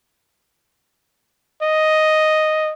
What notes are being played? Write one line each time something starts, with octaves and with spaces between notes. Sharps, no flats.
D#5